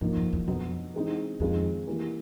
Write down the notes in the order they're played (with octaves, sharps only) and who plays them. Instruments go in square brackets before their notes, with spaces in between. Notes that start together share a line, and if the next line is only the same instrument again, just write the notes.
[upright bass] G2 [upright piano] F3 A#3 D#4
[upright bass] F2
E2
[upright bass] F2 [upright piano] B2 F#3 B3
[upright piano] E3 G#3 C4 D#4
[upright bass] F2 [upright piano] D#3 G#3 C4 F4
[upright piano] E3 G3 A#3